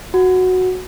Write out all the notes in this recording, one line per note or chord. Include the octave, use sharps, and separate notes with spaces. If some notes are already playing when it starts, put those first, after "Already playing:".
F#4